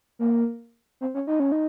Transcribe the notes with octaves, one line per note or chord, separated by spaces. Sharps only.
A#3
C4
C#4
D#4
C#4
D#4